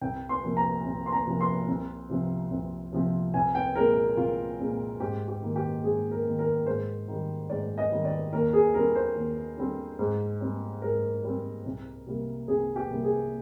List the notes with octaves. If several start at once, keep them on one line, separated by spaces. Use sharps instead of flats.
C2 G5
C6
C3 F3 A#3
A#5
C2
C6
A#5
C3 F3 A#3
C6
C2
C3 F3 C4
C2
C3 F3 C4
C2 G#5
G5
A#2 G#3 C4 A#4
C2 F4
A#2 G#3 C4
G#2 G4
G4
D#3 A#3
G4
G#2 G#4
A#4
D#3 A#3
A#4
G#2 C5
D#3 G3
G#2 D5
D#5
D#3 G3
D5
D#2 A#4
G#4
D3 G3 C4 A#4
C5
D#2
D3 G3 C4
G#2
G3 C4
G#2 A#4
G3 C4
C2
C3 G3 A#3
C2 G#4
G4
C3 G3 A#3
G#4